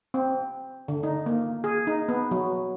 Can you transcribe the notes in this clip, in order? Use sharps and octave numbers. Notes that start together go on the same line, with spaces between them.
C4
D3
D#4
A#3
G#4
D#4
B3
F#3